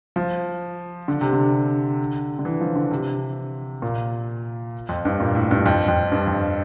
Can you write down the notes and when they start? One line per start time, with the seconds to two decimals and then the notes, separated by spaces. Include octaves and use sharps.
0.16 F3
1.08 D3
1.21 C3
1.33 D3
2.39 D3
2.45 E3
2.61 F3
2.75 D3
2.91 C3
3.82 A#2
4.89 F2
5.05 G2
5.20 A#2
5.35 A2
5.51 G2
5.66 F2
5.88 F2
6.12 G2
6.28 F2